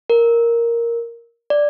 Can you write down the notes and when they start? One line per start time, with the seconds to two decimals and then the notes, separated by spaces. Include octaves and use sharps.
0.10 A#4
1.50 D5